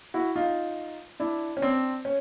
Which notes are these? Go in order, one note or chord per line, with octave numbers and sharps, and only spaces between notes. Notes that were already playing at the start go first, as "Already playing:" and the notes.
E4 F#4
D#4 F4
D4 E4
C#4
C4 D4
C#4